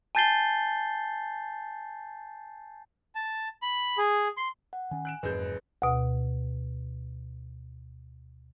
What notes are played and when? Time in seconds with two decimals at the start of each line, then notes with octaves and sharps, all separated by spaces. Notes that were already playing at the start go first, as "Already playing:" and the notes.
0.15 G#5 A5 G6 A6 C7 G7
3.15 A5
3.62 B5
3.98 G#4
4.37 C6
4.73 F#5
4.91 D#3 C#4 G#5
5.05 F#6 D7 E7
5.23 F#1 F2 G#2 G#4 B4 G6
5.82 D2 B2